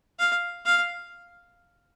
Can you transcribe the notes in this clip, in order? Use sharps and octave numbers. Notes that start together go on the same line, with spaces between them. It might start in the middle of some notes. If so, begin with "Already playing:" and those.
F5
F5